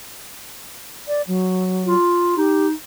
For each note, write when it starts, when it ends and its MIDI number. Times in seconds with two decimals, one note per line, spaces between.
1.08 1.22 74
1.28 1.95 54
1.86 2.36 65
2.37 2.73 63
2.37 2.67 67